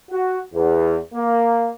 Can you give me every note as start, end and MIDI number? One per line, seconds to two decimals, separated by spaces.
0.11 0.39 66
0.55 0.98 40
1.14 1.71 58